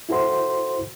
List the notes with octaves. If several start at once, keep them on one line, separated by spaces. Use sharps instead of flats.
E4 F#4 A4 C5 C6